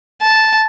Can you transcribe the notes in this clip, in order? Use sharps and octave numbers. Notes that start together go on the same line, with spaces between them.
A5